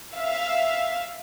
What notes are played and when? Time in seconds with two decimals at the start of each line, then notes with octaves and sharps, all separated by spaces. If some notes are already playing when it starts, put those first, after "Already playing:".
0.16 E5 F5